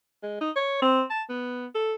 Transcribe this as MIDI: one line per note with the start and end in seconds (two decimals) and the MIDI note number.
0.23 0.38 56
0.41 0.50 63
0.56 0.80 73
0.82 1.02 60
1.10 1.22 81
1.29 1.67 59
1.75 1.94 69